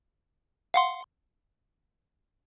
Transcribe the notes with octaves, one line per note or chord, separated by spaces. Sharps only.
F5 F#5 C6